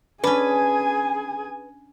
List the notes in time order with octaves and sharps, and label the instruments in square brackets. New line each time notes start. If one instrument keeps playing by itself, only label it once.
[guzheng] C#4 D4 [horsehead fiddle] G#4 [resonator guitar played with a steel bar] B4 [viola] G#5